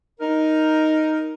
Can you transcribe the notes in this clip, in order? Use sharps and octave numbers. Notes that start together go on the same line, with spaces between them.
D#4 A#4